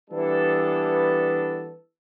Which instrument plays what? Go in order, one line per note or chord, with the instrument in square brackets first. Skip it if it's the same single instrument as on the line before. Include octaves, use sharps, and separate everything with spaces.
[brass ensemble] E3 G3 B3 D4 A4